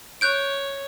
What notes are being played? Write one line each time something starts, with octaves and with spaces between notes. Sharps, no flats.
C#5 F#6 G6 D7